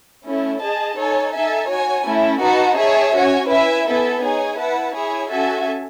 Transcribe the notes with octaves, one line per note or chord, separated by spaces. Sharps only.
A3 C#4 E4
G#4 D#5 A5
D#4 A4 C#5 G#5
D#4 A4 E5 G#5
F#4 C#5 G#5
A3 C#4 E4
D#4 F#4 B4 F#5 A5
G#4 C#5 E5 A5
C#4 F#4 C#5 G#5
E4 B4 E5 G#5
B3 E4 A4 E5 G#5
D#4 G#4 C#5 G#5
E4 B4 F#5 A5
E4 G#4 C#5 G#5
C#4 F#4 A4 E5 G#5